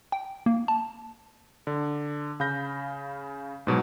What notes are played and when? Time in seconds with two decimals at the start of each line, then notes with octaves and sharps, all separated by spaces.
0.12 G5
0.46 A#3
0.68 A5
1.67 D3
2.40 C#3 F5 B5 G6 A#6
3.67 G#2 B2 F#3